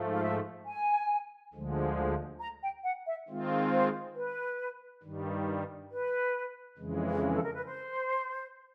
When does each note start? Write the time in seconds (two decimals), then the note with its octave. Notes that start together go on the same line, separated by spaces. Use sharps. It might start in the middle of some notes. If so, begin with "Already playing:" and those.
Already playing: G#2 F3 A3
0.13 F5
0.22 E5
0.66 G#5
1.54 D2 D3 F3 G#3
2.40 A#5
2.63 G5
2.84 F#5
3.06 E5
3.28 D#3 G#3 C4 F4
3.72 C5
4.16 B4
5.03 G2 D#3 G3
5.91 B4
6.78 F2 C#3 E3 G#3
7.33 A4
7.44 A#4
7.54 B4
7.66 C5